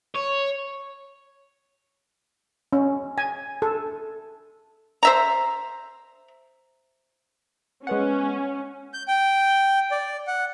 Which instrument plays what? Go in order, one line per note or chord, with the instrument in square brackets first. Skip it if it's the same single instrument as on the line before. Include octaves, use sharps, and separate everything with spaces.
[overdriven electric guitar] C#5
[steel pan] C#4
G#5
A4
[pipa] C5 E5 A#5
[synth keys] G#3 B3 F#5 [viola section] C#4
[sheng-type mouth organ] G6
G5
D5
F#5